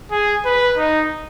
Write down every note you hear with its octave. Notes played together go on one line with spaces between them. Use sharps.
G#4
B4
D#4